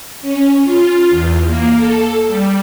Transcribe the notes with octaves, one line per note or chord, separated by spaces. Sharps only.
C#4
F4
E2
A#3
A4
G3